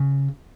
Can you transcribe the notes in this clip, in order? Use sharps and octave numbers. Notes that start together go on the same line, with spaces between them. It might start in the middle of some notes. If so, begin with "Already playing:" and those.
Already playing: C#3